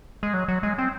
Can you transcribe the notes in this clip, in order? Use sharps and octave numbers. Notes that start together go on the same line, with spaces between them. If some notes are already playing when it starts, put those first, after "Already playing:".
G#3
F#3
F#3
G#3
C4